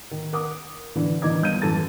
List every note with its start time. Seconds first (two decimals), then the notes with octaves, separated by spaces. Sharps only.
0.11 D#3
0.33 A#4 F#5 D6 D#6
0.96 D3 E3
1.22 D#3 E3 D#4 D#5 D6 G#6
1.42 G1 G6 D#7
1.62 F#2 E3 A4 A5 A6